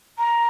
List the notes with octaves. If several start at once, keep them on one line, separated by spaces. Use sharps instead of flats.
A#5